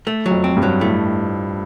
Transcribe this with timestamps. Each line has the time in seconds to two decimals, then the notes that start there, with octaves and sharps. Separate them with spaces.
0.07 A3
0.26 F#3
0.31 F2
0.44 C4
0.57 G2
0.63 F#3
0.81 A2 A3